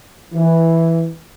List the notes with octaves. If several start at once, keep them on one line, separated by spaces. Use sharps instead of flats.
E3